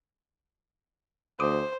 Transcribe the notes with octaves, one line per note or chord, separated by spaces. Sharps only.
D2 C5 D6 D#6